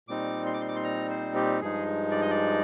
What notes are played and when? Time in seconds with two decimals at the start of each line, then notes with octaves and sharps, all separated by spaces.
0.08 A#2 G3 C4 D#4 D6
0.46 C6
0.54 D6
0.61 C6
0.68 D6
0.76 C6
0.84 A#5
1.10 C5
1.35 G4
1.61 G2 F3 G#3 D#4 G#4
2.11 D5
2.21 D#5
2.31 D5